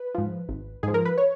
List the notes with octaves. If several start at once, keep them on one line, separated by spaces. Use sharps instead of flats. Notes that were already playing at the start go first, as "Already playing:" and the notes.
Already playing: B4
G#2 F3
G#1
G#2 F3 G#4
A#4
B4
C#5